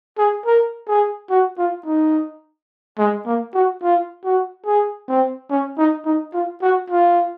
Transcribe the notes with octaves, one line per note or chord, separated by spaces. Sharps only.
G#4
A#4
G#4
F#4
F4
D#4
G#3
A#3
F#4
F4
F#4
G#4
C4
C#4
D#4
D#4
F4
F#4
F4